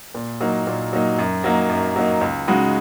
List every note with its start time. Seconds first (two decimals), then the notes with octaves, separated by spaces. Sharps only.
0.14 A#2
0.41 F#3 A#3 D#4
0.67 A#2
0.93 F#3 A#3 D#4
1.19 F#2
1.44 F#3 A#3 D#4
1.69 F#2
1.96 F#3 A#3 D#4
2.21 C#2
2.48 C#3 G#3 D#4 F#4